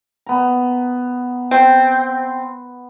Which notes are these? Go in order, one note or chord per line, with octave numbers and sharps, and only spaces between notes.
B3 A#5
C4